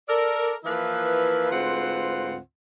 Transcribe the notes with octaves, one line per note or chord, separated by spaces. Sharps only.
A4 A#4 D5
E3 F3 A#3 E4 B4
D2 G#2 C4 F4 B4 F#5